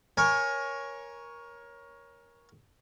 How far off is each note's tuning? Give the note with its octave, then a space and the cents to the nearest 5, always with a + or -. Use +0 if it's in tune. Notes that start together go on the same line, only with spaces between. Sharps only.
A#4 +20 C#5 +0 G#5 +0